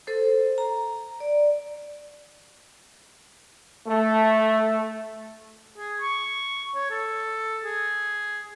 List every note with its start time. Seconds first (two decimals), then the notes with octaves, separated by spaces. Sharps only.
0.07 A4 C5
0.58 A#5
1.20 D5
3.87 A3
5.78 G#4
6.01 C#6
6.75 C#5
6.91 A4
7.65 G#4